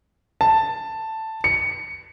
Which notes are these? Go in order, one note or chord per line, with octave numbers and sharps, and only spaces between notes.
A5
C#7